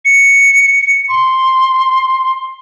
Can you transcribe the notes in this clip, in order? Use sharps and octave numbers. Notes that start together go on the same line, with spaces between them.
C#7
C6